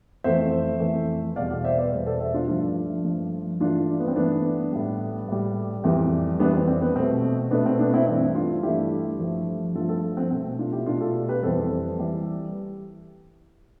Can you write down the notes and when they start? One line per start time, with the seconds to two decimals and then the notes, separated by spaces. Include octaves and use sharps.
0.24 F2 E3 A3 C5 E5
0.80 F2 E3 A3
1.36 E2 B2 G3 D5 F5
1.51 D5 F5
1.65 C5 E5
1.78 B4 D5
1.93 E2 B2 G3
2.07 A4 C5
2.21 C5 E5
2.34 D4 F4
2.48 G2 F3 A3 D4 F4
3.04 G2 F3 A3
3.60 G2 E3 A3 D4 F4
4.00 B3
4.08 C4
4.16 G2 E3 A3 B3 D4
4.72 A2 G3
5.29 A2 G3
5.84 F2 E3 G3
6.40 F2 E3 G3 B3 D4
6.53 C4
6.68 C4
6.82 B3
6.95 B2 A3 C4
7.51 B2 A3 B3 D4
7.66 C4
7.79 B3 D4
7.94 C4 E4
8.07 G2 E3 A3 C4 E4
8.35 D4 F4
8.63 G2 E3 A3 E4 G4
9.19 G2 F3 A3
9.75 G2 F3 A3 F4 A4
9.89 F4 A4
10.17 C4
10.31 B2 A3 C4
10.59 D4 F4
10.73 E4 G4
10.86 B2 A3 D4 F4
11.01 F4 A4
11.28 G4 B4
11.42 F2 E3 G3 A4 C5
11.99 E3 G3